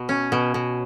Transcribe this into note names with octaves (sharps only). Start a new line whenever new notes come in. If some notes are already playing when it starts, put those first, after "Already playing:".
Already playing: B2
C#4
B2
B2